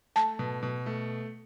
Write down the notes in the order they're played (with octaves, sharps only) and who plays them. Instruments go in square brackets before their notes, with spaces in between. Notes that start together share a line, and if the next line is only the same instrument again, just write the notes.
[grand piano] A3 [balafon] A5
[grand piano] B2
B2
A3